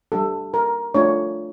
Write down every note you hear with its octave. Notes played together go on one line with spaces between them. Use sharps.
G3 D4 G4 A4
A#4
A3 D4 F4 C#5